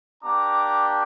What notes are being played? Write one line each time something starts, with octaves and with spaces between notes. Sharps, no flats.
A#3 D4 G4 A#5 D6